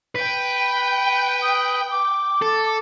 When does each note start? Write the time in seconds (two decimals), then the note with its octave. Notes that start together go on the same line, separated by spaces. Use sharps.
0.16 B4 G5
1.41 D#6
1.91 D6
2.42 A4